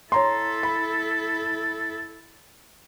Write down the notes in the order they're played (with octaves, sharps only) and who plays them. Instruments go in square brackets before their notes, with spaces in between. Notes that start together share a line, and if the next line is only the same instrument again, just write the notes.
[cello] E4 A4 [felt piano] C#5 A#5 C6
[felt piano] B5